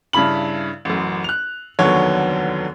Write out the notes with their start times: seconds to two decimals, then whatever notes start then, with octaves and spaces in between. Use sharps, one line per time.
0.13 G2 C#3 E4 B5 F#7
0.85 A1 F#2
1.24 F#6 F7
1.79 F1 D#2 D3 F#3 B3 C#5